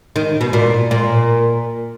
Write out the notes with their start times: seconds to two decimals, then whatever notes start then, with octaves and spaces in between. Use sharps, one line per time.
0.16 D#3
0.41 B2
0.53 A#2
0.91 A#2